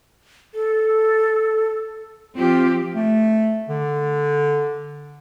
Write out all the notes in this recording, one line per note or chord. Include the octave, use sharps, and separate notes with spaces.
A4
F3 C4 F4 G4
A3
D3